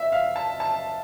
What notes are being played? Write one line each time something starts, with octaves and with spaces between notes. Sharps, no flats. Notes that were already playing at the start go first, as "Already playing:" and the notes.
Already playing: E5
F5
A5
A5